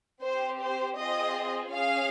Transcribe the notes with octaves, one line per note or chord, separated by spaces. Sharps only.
C4 G4 C5
C5
C4 F4 G#4 D#5
C#4 G#4 F5